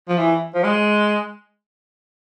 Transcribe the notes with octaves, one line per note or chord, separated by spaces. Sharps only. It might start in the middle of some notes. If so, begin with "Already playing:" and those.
F3
E3
F3
G#3